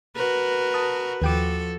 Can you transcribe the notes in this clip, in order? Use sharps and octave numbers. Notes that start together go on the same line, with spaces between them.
F#4 A#4 B4
A5 D#6
D#2 F3 F#4 A4 G5 D6